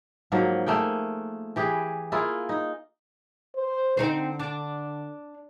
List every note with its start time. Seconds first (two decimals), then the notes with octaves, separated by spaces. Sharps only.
0.32 G#2 F3 F#3 A#3
0.66 A3 A#3 G#4 G5
1.56 E3 G4 G#4 B4
2.12 A#3 E4 F4 G#4
2.49 D#4
3.55 C5
3.97 D3 C4 D#4 C5
4.40 D4